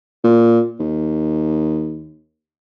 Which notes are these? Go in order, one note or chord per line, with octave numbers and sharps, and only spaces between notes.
A#2
D#2